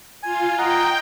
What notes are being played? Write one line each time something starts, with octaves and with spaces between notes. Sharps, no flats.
F4 G#5
D#5 F#5 G5 A#5